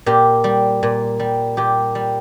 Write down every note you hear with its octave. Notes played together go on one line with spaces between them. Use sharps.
A#2 G4
G3
A#2
G3
A#2 G4
G3